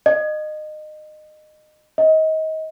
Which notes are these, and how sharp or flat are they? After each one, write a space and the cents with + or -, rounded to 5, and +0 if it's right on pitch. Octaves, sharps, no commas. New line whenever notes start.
D#5 -25
D#5 +25